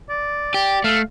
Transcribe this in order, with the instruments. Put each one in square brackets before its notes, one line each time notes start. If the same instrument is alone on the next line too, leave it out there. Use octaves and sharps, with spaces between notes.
[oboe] D5
[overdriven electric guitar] G4 [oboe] D5
[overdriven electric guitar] A3 [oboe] F5